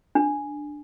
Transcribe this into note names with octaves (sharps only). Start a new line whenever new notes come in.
D4